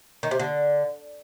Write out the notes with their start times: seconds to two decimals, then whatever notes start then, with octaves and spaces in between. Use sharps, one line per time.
0.23 D#3
0.31 C3
0.39 D3